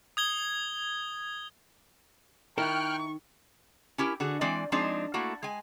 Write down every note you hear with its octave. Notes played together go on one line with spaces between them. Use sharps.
D#6 G#6 G7
D#3 D#4 E4 A#4 G5 C#6 F6 F#6
C#4 E4 G4 A#4
D3 F#4 G#4
E3 G#3 C4 D5
F3 G#3 C4 D4 D#4
A3 A#3 E4 F#4
G#3 G#5